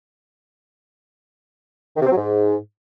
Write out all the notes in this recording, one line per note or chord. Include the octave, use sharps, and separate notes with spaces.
D#3
C3
C4
F#3
G#2